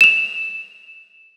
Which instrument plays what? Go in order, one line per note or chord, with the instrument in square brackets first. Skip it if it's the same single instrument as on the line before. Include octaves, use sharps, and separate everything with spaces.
[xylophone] E7 F7